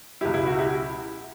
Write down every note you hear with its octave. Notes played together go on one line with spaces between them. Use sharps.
C#2 B2 F#3 E4 G4
E4
F#4
E4 G4